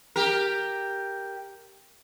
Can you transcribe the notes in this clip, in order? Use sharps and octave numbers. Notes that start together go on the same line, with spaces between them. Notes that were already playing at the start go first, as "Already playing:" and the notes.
G4 A#4